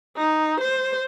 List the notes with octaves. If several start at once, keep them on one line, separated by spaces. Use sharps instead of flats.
D#4
C5